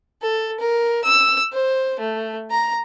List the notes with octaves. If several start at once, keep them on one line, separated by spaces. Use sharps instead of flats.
A4
A#4
E6
C5
A3
A#5